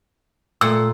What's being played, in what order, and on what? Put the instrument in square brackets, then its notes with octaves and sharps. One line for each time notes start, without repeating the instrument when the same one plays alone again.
[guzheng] A#2 [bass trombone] A3 [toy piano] E6